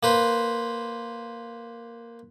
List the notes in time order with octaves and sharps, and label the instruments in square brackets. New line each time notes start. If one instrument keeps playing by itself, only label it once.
[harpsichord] A#3 B4 C5